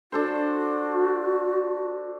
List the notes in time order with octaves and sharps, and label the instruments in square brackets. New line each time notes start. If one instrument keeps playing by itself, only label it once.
[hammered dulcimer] D4 A4 C5 [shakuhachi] F#4